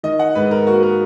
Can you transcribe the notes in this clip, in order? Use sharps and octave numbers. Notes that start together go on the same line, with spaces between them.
D#3 D#5
F#5
G#2 B4
A#4
A#3 F#4
A#4